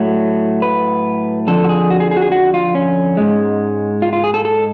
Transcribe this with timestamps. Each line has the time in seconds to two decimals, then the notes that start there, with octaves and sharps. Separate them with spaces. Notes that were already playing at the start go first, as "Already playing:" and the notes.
Already playing: A2 F#3 A3
0.62 B4
1.47 F2 D3 F3 A4
1.64 F#4
1.69 G#4
1.90 F#4
2.00 G#4
2.11 G#4
2.17 F#4
2.21 G#4
2.32 F#4
2.54 F4
2.75 C#4
3.17 G#2 G#3
4.02 F4
4.13 F4
4.24 G#4
4.34 A4
4.45 A4